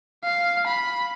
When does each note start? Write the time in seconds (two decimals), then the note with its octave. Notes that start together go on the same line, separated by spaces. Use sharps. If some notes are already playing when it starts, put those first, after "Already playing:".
0.24 F5
0.67 B5